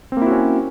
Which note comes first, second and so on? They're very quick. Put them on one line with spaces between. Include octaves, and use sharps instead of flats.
C4 A#3 E4 F#4 C#4